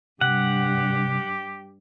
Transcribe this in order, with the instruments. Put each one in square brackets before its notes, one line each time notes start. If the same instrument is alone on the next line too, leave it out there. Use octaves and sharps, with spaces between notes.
[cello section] G2 [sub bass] C3 [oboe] G4 [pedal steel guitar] F#5